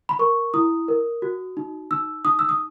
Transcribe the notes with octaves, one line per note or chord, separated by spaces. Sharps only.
B5
A#4 C#6
E4 D#6
A#4
F#4
D#4
D#4 E6
D#4 D#6
E6
D#6